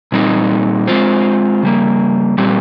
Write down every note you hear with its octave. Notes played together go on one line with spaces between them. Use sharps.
A#2 G3 C4 D#4
G#3 C4 F4 C5
C#3 G3 A#3
A#2 G3 C4 G4